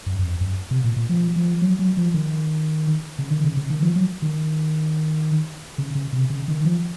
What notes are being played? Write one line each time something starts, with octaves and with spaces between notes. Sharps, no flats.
F#2
F#2
F2
F#2
C3
A#2
A#2
F3
F3
F#3
F#3
F3
D#3
C#3
D#3
C#3
C#3
D#3
F3
F#3
D#3
C#3
C#3
C3
C#3
D#3
F3